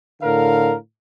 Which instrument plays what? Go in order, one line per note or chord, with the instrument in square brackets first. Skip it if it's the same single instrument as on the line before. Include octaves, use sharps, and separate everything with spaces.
[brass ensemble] A2 D3 A#4 F5